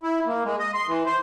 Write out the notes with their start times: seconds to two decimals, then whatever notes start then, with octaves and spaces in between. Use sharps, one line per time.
0.03 E4
0.27 A#3
0.45 G#3
0.59 D#5
0.74 C6
0.88 E3
1.06 C5